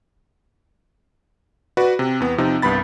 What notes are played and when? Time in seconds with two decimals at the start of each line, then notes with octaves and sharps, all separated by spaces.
1.77 F#4 B4 D5
1.99 C3
2.20 E2 B3
2.38 C3 F3 D#4
2.62 C2 G2 B3 B5 A6